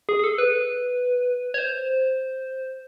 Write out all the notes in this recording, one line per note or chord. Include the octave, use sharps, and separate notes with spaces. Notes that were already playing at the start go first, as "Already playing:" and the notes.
G#4
G#4
A4
B4
C#5
C5